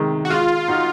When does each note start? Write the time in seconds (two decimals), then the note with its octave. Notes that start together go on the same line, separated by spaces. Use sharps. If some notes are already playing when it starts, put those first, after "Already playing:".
Already playing: C3 D#3 G#3
0.25 F#4
0.30 G#3 F4
0.68 D#4 F#4